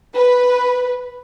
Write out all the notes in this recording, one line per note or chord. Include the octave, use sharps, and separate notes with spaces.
B4